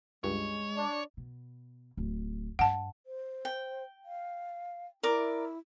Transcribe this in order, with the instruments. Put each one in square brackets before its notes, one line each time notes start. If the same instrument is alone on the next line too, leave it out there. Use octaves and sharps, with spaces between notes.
[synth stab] C#2 G2 [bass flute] G#3 [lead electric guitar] C#5
[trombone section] D4
[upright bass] B2
D1
[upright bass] G2 [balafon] F#5 A5
[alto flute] C5
[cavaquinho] G5
[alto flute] F5
[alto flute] E4 [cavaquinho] A#4 D5 D6